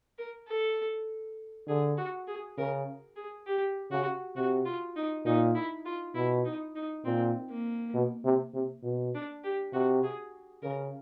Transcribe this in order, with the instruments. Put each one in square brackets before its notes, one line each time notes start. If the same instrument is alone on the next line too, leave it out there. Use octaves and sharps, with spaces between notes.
[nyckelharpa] A#4
A4
[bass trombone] D3 [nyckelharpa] G#4
[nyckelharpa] F#4
G#4
[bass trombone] C#3 [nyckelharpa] A#4
[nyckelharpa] G#4
G4
[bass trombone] C#3 [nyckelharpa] F#4
[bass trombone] C3 [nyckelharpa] F#4
[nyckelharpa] F4
D#4
[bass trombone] A#2 [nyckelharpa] D#4
[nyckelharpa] E4
F4
[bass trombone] B2 [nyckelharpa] E4
[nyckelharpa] D#4
D#4
[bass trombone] A#2 [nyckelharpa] C4
[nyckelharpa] A#3
[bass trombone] B2
C3
C3
B2
[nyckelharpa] D4
G4
[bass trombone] C3 [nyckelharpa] F#4
[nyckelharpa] G#4
[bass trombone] C#3 [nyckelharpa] A#4